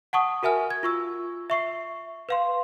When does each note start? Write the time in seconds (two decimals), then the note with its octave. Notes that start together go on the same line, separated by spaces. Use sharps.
0.13 F#5 A5 C#6 D#6
0.43 F#4 A#4 E5 G#5 F6
0.70 G#6
0.83 F4 C#6 E6
1.50 E5 C#6 C7
2.29 B4 F5 C6